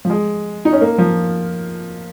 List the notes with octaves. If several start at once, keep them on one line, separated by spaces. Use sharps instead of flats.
F3
G#3
D#4
C#4
A#3
F3